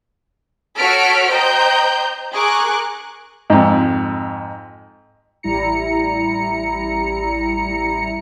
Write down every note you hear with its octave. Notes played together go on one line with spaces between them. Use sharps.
F#4 A4 C#5 F6 B6 D7
C5 D#5 G5 A#5 G6
G#4 A#4 C#6 D6 F#6
F2 G#2
A1 G3 E4 A#5 C#7